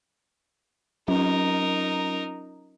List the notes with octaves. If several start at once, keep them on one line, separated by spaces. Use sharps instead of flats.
F#3 C#4 D#4 F4 A#4